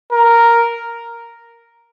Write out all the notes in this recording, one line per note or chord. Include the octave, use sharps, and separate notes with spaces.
A#4